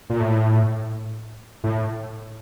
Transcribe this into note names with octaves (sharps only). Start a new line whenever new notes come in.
A#2
A2
A2